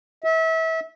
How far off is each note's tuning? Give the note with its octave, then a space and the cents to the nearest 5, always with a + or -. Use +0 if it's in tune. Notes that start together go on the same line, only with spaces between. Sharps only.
E5 -30